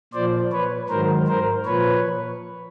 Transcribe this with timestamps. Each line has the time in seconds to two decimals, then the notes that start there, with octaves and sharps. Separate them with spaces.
0.13 A#2 F3 C5 D5
0.52 B4 C#5
0.89 G#2 D#3 F#3 A#4 C5
1.27 A#4 C5
1.65 A#2 F3 B4 C#5